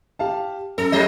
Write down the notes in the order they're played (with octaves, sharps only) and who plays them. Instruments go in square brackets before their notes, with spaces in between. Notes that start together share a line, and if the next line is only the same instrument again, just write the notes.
[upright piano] G4 F5 A5
[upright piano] F#2 [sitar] A4
[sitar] A2 F#3 D#5